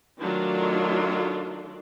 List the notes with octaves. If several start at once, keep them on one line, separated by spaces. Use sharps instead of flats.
D#3 F#3 A3 D4 F4